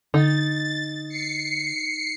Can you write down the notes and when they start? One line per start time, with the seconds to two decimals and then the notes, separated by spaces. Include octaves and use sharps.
0.14 D3 D#4 A6
1.09 C7 C#7